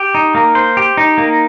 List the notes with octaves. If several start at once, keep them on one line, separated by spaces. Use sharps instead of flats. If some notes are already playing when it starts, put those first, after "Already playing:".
Already playing: G4
D#4
A#3
C5
G4
D#4
A#3